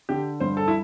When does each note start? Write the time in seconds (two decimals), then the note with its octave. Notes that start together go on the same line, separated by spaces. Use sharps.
0.09 D3 G4
0.40 G2 C5
0.57 A4
0.68 E4